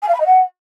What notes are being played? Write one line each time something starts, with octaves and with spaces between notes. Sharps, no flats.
G#5
F5
B5
D#5
F#5